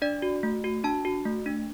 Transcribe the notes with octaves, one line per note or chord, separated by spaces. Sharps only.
D4 D5
F#4
A3
F#4
D4 A5
F#4
A3
D4